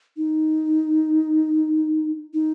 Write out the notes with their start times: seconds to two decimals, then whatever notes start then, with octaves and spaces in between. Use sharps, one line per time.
0.17 D#4
2.34 D#4